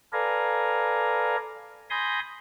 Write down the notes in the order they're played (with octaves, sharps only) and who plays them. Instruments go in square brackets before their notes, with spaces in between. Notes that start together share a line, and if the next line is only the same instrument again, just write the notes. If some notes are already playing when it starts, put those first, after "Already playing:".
[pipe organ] A4 B4 D5 F5 G#5 A#5
G#5 B5 C6 D#6 G6 A#6